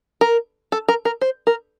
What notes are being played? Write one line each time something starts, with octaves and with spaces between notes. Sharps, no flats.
A#4
A4
A#4
A#4
C5
A#4